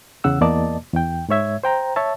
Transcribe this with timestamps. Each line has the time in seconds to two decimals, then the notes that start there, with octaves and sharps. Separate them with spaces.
0.24 E2 C#3 F#5 E6
0.41 E2 A#3 D5 D#5 A5
0.93 E2 G5
1.28 G#2 G#3 C#5 E5 G#6
1.64 C5 G5 A#5
1.96 C#5 E5 A5